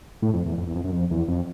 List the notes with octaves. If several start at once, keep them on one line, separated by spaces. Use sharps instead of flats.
A2
F2
E2
F2
E2
F2
F#2
F2
E2
F2